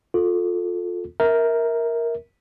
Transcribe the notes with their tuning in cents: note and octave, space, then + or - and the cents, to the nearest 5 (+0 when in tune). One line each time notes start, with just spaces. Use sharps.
F4 +25 A4 +0
A#4 +0 E5 -25